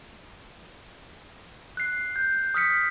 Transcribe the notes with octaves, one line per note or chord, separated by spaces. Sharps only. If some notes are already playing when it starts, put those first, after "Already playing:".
F#6 C7
G6
D#6 F6 B6 C#7